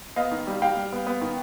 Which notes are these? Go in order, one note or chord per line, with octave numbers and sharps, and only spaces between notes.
B3 D#5 F5
D#3
G3
G3 F5 G5
G3
B3
B3
D#3